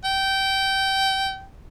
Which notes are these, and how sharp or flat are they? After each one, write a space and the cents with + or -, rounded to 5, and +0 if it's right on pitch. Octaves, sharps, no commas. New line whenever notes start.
G5 -20